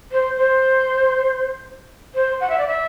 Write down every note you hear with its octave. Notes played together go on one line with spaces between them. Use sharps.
C5
C5
C5
F#5
E5
D5
E5